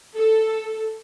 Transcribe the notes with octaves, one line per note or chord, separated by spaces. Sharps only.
A4